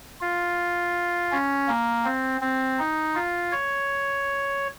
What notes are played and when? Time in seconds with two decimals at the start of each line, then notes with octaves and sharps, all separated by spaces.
0.21 F4
1.32 C#4
1.68 A#3
2.05 C4
2.41 C4
2.79 D#4
3.15 F4
3.52 C#5